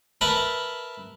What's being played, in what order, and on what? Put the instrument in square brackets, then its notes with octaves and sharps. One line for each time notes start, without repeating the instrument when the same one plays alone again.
[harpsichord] A#4 B4 E5 A5 B5